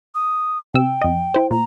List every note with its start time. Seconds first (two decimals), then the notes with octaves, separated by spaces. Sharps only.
0.15 D#6
0.74 C3 G5 E6
1.01 F2 D#5
1.34 E4 C5
1.51 A#2 A#5